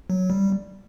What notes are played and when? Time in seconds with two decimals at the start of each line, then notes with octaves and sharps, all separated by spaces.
0.10 F#3
0.30 G3